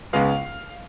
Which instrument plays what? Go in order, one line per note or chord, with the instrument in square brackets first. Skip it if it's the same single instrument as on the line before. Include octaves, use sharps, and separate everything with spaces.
[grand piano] C#2 C#3 G#3 B3 F5